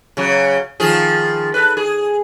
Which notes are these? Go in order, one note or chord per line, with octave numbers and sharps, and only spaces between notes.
C#3 F#3
D#3 F3 G#4
A4 B4
G#4